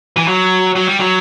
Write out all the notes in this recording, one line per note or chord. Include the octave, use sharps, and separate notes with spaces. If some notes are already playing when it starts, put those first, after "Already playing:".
E3
F#3
F#3
G3
F#3